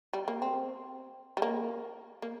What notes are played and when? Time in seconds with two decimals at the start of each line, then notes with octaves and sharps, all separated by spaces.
0.13 G3
0.28 A#3
0.42 C4
1.37 G3
1.42 A#3
2.22 A#3